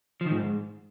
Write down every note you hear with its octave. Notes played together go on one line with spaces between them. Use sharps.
F3
D#3
G#2